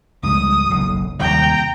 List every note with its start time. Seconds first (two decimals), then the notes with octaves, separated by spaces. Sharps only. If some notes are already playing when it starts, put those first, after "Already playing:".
0.23 C#2 G#2 G3 D#6
0.70 F#1 B1 A2
1.19 D#2 C3 G3 G5 A#5